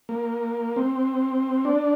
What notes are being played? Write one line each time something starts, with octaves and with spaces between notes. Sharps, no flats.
A#3
C4
D4